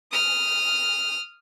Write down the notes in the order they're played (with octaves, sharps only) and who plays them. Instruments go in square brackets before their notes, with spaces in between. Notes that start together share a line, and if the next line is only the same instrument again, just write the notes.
[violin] D#6 F6